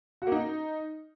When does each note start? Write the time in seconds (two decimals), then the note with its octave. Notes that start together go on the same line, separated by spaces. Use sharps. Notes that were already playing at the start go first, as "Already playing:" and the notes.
0.22 F#4
0.27 A#3
0.32 D#4